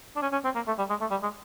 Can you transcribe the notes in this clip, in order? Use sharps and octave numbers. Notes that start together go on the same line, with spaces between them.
D4
C#4
C#4
C4
A#3
A3
G3
G#3
A3
G3
G#3